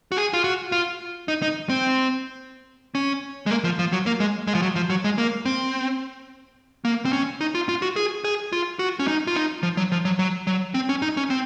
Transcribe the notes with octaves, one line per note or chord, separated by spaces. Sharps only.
F#4
G#4
F4
F#4
F4
D#4
D#4
C4
C#4
G#3
A#3
F3
F3
F#3
A#3
G#3
G#3
F3
F#3
F3
F#3
G#3
A#3
C4
A#3
C4
C#4
D#4
F4
F4
F#4
G#4
G#4
F4
F#4
C#4
D#4
F4
D#4
F3
F#3
F3
F#3
F#3
F#3
C4
C#4
D#4
C#4
C4